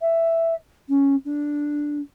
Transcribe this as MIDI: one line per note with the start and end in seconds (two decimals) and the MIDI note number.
0.01 0.54 76
0.89 1.15 61
1.25 1.98 62